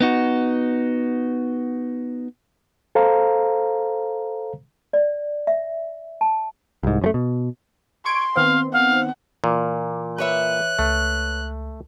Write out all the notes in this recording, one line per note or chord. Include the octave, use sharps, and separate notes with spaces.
B3 D#4 F#4
A4 C5 F5 A#5
D5
E5
A5
C2 G#2
F#2 F3 A3
B2
C6 C#6 G#6 D7
D#3 B3 C4 F5
F5 F#5
A#2 E3 D6
B4 C#5 E5 F#6
C#2 A3